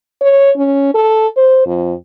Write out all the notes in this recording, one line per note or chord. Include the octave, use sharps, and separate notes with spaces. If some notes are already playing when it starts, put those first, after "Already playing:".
C#5
C#4
A4
C5
F2